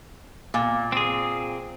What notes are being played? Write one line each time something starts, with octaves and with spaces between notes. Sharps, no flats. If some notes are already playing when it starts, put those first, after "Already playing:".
A#2
C4 G#4